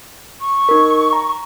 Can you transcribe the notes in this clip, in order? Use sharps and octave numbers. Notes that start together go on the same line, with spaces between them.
C#6
D#4 A#4
A#5